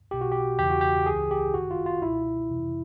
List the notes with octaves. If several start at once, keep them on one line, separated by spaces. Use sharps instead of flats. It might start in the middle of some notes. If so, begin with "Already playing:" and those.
B1 B2 G4
F#4
G4
E2 C#3 E3 G4
F#4
G4
C#2 C#3 E3 G#4
G4
G1 F#2 D#3 F#4
F4
F4
C#2 B2 E4
F2 C3 E3